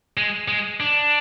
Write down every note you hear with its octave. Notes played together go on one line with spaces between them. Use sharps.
G#3
G#3
D4